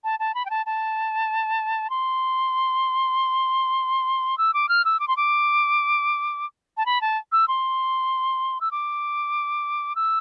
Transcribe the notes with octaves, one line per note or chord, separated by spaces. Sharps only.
A5
A5
B5
G5
A5
A5
C6
E6
D6
F6
E6
D6
C6
D6
A5
B5
A5
E6
C6
E6
D6
E6